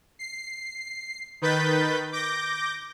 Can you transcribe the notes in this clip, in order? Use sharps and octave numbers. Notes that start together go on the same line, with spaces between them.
C7
D#3 B4 G6 A6 B6
D6 G6 A#6